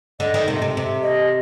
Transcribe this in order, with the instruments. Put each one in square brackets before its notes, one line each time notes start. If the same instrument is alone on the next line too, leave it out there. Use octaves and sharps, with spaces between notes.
[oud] D3 [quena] D#5
[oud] D#3
C3
C3
C3
[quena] D#5